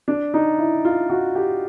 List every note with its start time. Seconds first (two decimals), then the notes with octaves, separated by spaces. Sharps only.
0.08 D4
0.34 D#4
0.58 E4
0.85 F4
1.10 F#4
1.35 G4